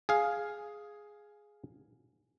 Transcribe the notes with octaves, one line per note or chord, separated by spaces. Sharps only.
G#4 F5